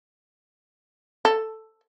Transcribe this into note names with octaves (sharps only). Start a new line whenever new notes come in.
A4